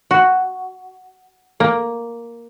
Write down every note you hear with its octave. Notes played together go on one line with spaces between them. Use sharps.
F#4
A#3